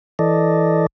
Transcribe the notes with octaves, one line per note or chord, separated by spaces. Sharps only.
E3 A4 D5 D#5